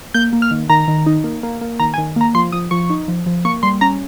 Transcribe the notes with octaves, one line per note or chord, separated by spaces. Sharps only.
A#3 G6
A#3
F6
D#3
D#3 A#5
D#3
D#4
A#3
A#3
A#3
D#3 A#5
G#5
D#3
A#3 A#5
F3 C6
F3 D#6
F3 C#6
D#4
F3
F3
A#3 C#6
G3 C6
C#4 A#5